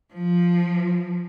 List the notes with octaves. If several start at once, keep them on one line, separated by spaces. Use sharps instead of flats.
F3